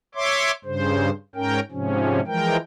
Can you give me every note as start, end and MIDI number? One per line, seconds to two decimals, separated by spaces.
0.15 0.52 73
0.15 0.52 76
0.15 0.52 84
0.15 0.52 86
0.65 1.10 43
0.65 1.10 49
0.65 1.10 72
1.35 1.60 44
1.35 1.60 61
1.35 1.60 70
1.35 1.60 79
1.71 2.20 44
1.71 2.20 48
1.71 2.20 53
1.71 2.20 61
2.27 2.57 52
2.27 2.57 53
2.27 2.57 56
2.27 2.57 70
2.27 2.57 79